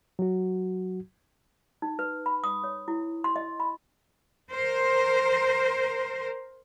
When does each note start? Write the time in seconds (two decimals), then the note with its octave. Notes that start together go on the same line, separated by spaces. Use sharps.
0.19 F#3 F#4
1.82 D#4
1.99 B4
2.26 B5
2.44 D#6
2.64 C#5
2.88 E4
3.24 C6
3.36 D#5
3.60 B5
4.50 A#4 C5